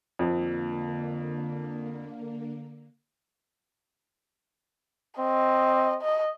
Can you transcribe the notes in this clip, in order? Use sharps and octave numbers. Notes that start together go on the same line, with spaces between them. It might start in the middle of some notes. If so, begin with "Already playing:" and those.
F2 D3 A#3
C4 D#5
D#5